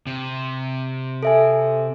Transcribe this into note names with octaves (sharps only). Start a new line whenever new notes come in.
C3
A4 E5 G#5